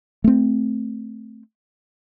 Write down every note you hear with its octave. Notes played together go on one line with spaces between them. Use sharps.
A3 C4